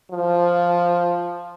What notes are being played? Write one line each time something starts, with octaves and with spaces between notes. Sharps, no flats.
F3